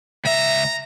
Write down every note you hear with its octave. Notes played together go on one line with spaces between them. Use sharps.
C#2 E5 A#5